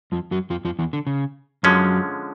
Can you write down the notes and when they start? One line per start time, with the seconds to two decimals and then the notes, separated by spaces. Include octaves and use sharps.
0.12 F2 F3
0.31 F#2 F#3
0.50 F2 F3
0.65 F2 F3
0.79 E2 E3
0.93 D3
1.07 C#3
1.63 F#2 D3 F3 F#3 G#3 C#4